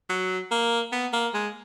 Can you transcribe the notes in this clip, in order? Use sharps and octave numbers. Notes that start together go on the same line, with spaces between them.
F#3
A#3
B3
A#3
G#3